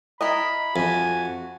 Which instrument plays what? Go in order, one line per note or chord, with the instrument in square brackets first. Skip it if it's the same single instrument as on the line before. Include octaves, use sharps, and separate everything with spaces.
[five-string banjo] E4 A#4 D#5 [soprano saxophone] B5
[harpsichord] F2 [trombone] F#4 [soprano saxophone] G#5